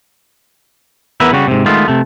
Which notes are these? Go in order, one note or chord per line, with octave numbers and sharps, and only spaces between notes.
E2 B3 E4 A#4 B4 E5
C#3 G3 F#4
G#2 C3
D#3 G#3 A3 B3 F4
C3 A3